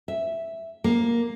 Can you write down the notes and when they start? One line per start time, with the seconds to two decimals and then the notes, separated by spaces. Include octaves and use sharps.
0.08 E5
0.84 A#3